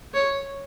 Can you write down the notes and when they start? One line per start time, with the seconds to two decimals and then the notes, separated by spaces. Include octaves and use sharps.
0.14 C#5